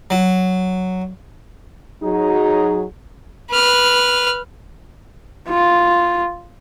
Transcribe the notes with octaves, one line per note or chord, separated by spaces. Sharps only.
F#3
F#3 D#4 G#4
B4 F6
F4